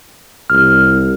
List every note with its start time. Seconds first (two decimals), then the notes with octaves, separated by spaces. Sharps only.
0.50 C2 F6